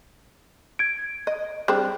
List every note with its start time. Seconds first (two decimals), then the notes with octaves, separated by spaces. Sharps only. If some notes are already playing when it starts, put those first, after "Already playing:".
0.79 G#6 D7
1.27 D#5
1.68 G3 C4 D4 G#4